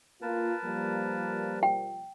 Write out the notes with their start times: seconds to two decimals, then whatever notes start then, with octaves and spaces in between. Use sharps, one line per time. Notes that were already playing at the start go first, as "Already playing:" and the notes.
0.22 A#3 F4 A#4 B4 A5
0.65 F3 G3 A#3
1.63 G5